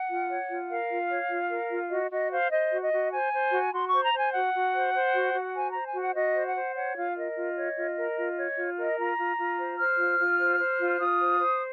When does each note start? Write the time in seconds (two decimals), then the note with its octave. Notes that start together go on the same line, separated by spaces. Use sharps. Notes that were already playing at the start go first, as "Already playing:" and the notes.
Already playing: F#5
0.09 F4
0.30 C#5
0.50 F4
0.69 A#4 F5
0.90 F4
1.10 C#5
1.30 F4
1.50 A#4
1.71 F4
1.90 F#4 D#5
2.11 F#4 D#5
2.32 C5 F5
2.51 C5 D#5
2.72 F#4
2.82 D#5
2.92 F#4
3.12 C5 G#5
3.32 C5
3.52 F#4
3.73 F#4 C6
3.88 C5 C#6
4.03 A#5
4.13 C5
4.18 G#5
4.33 F#4 F#5
4.54 F#4
4.73 C5
4.93 C5
5.14 F#4
5.34 F#4
5.55 C5 G#5
5.69 C5 A#5
5.85 G#5
5.94 F#4
6.00 F#5
6.15 F#4 D#5
6.35 C5
6.45 F#5
6.56 C5
6.75 C#5 F#5
6.96 F4 F5
7.17 A#4 D#5
7.36 F4
7.56 C#5
7.76 F4
7.97 A#4
8.17 F4
8.38 C#5
8.57 F4
8.78 A#4 D#5
8.98 F4 A#5
9.18 F4
9.38 F4
9.58 C5
9.78 C5 F6
9.99 F4
10.19 F4
10.39 C5
10.59 C5
10.80 F4
10.99 F4 D#6
11.20 C5
11.40 C5